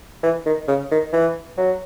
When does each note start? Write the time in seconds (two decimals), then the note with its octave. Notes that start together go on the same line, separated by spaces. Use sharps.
0.23 E3
0.46 D#3
0.68 C#3
0.91 D#3
1.13 E3
1.58 F#3